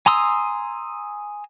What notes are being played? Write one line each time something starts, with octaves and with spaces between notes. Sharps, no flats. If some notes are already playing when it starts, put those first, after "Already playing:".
G#5 A#5 C6 D#6 E6